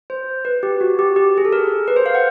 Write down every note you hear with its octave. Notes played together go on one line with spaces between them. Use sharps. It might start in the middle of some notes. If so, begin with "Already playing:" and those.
C5
B4
G4
F#4
G4
G4
G#4
A4
A#4
B4
C5
F5
F#5